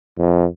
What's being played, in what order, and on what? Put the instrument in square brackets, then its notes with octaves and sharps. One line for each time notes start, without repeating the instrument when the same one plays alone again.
[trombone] F2